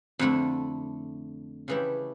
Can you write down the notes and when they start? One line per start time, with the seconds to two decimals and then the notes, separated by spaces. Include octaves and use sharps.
0.19 F2 D3 A3 E4
1.68 C#3 E3 A3 E4 G4